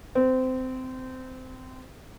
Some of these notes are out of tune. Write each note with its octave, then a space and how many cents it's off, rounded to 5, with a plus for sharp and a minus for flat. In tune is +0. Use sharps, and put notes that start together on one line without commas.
C4 -20